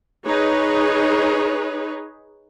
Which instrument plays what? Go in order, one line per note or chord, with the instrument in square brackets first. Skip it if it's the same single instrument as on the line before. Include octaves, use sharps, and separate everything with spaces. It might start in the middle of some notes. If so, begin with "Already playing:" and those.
[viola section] D#4 G#4 B4 C#5